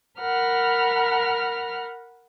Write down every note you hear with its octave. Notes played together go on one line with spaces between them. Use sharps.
A#4 F#5 B5 F6